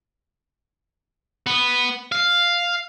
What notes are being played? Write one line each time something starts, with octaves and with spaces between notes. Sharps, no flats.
B3
F5